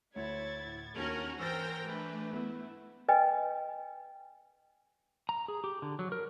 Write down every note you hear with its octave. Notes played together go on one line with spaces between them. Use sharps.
D2 E4 C#5 G#6 A6
A2
D#2 C#4 D4 F#4 G4 A#4 C#5 F6
E3 A#4 C5 G5 E6 A6 A#6
A3 D4 B4
B3 E4
B4 D#5 G5 G#5
A#5
G#4
G4
D3
F#3
A#4